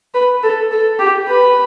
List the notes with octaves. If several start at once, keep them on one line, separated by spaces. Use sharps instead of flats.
B4
A4
A4
G4
B4